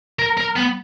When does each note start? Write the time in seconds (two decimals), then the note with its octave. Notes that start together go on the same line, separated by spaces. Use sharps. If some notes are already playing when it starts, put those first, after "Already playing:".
0.19 A#4
0.38 A#4
0.56 B3